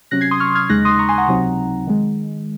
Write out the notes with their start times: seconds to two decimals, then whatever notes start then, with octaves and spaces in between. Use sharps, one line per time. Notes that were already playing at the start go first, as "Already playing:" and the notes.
0.11 C3 F#3 C#4 F#6 A#6
0.21 G#6 C7
0.31 C6 D#6
0.40 C#6 F6
0.55 F6 G#6
0.69 D#2 C#3 G#3 D#4 F#6 A#6
0.85 C6 D#6
0.99 A#5 C#6
1.09 G#5 C6
1.18 F#5 A#5
1.28 C#2 C3 F#3 C4 D#4
1.87 D#3 G#3